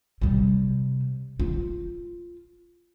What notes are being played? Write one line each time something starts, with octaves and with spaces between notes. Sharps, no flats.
C3 G3
F4